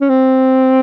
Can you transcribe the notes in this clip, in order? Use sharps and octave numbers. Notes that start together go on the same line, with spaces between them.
C#4
C4